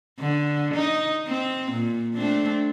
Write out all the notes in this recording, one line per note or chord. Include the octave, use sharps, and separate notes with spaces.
D3
D#4
C4
A#2
A3 C4 D4